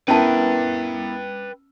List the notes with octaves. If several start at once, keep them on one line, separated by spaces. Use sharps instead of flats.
B3 C#4 E4 A#4 B4 G5 A5